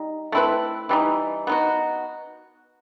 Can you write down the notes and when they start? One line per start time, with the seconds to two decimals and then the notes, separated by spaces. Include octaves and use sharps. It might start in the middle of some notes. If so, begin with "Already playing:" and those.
Already playing: G3 D#4
0.32 A3 C4 E4 B4
0.89 E3 G3 D#4
1.47 B3 D#4 F#4